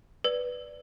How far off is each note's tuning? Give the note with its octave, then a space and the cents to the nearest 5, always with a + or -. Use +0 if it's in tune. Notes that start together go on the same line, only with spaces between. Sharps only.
B4 +0 D5 +0